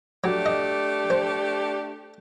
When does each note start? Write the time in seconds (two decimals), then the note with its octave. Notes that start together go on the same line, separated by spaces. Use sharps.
0.24 F#3 A3 D4 G4
0.46 D#5
1.10 C5